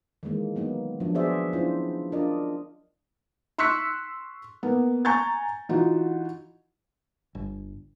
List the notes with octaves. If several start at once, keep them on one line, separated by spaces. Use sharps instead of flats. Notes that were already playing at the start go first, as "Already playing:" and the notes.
D#3 E3 G#3 A#3
F#3 A#3 B3 D#4
F3 F#3 D4
B3 F#4 G#4 C5 D5 E5
C#4 D4 E4 F4 C5
D4 F4 A#4 D5 D#5
C6 C#6 E6 F#6 B6 C#7
A#3 B3
G#5 A#5 C#6 G6 A6
E3 D#4 F4 F#4
G1